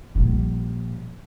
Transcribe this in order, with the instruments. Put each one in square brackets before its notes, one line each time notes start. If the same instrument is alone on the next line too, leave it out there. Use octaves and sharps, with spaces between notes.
[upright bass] A#1 G3